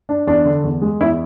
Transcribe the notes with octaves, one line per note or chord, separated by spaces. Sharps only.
D4
E2 D4
D3
E2
G#3
E2 E4